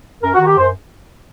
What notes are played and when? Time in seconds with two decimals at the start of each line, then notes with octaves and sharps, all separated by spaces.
0.23 F#2 A#4
0.34 F#4
0.40 D#3
0.47 G4
0.57 F#2 C5